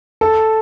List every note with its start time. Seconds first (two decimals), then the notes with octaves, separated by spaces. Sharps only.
0.21 A4